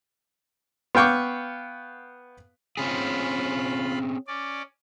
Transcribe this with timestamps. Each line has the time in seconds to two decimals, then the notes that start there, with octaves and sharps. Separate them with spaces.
0.95 B3 F5 G5 C#6 D6
2.77 C4 C#4 F4 G#4 B5
4.27 C#4 D5